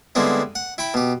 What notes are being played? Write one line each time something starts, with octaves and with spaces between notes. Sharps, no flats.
D3 G3 G#3 B3 C4 E4
F#5
E4 G5 B5
B2 G4